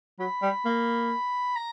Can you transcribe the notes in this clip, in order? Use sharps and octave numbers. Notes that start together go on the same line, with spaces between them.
F#3 B5
G3
A#3
A#5